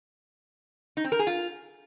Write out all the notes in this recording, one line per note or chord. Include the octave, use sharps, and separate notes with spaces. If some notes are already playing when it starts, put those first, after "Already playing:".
D#4
C4
A#4
G#4
F4